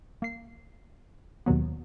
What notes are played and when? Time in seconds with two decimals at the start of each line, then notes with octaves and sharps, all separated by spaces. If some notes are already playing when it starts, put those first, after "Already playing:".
0.22 A#3 C7
1.46 D#2 B2 D#3 F#3 B3